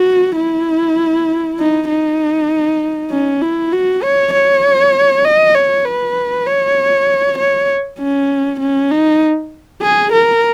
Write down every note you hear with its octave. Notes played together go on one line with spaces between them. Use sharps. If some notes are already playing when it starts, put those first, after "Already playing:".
Already playing: F#4
E4
D#4
D#4
C#4
E4
F#4
C#5
C#5
D#5
C#5
B4
C#5
C#5
C#4
C#4
D#4
G#4
A#4